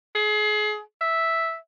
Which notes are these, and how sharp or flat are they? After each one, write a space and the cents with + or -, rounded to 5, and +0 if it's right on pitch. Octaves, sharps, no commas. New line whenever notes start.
G#4 +30
E5 -5